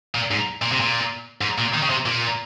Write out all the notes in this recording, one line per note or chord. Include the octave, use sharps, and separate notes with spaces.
A#2
G#2
A#2
C3
A#2
G#2
A#2
D#3
C#3
C3
A#2